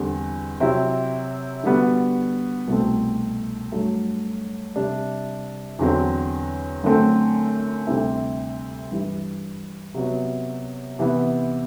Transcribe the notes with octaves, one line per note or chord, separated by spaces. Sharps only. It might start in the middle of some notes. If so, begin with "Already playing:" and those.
Already playing: E2 D3 G3 C4
C3 F#3 C4 E4
D3 G3 B3 F#4
C2 B2 A3 C4
G2 F#3 A3
C3 G3 D4
E2 D3 F#3 C4
F#2 D3 A3 C4
D2 C3 G3 C4 E4
G2 E3 G3
C3 F#3 B3
C3 E3 B3